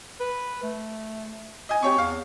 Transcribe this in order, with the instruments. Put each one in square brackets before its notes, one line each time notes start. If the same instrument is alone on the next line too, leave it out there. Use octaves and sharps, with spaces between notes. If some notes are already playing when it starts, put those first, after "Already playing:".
[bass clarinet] B4
A3
[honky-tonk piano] D#5 G#5
[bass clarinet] C4 [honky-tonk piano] G4 C#5 C#6
[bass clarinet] E2 [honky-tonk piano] F5